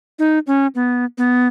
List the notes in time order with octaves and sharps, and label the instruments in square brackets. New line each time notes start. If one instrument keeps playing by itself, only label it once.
[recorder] D#4
C#4
B3
B3